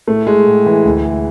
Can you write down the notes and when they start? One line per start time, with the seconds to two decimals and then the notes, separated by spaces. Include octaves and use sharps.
0.07 A2 A3
0.27 G#3
0.46 A2
0.66 E3
0.85 D2
1.05 G#3